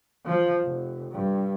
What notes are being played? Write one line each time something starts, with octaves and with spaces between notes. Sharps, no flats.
F3
F1
G2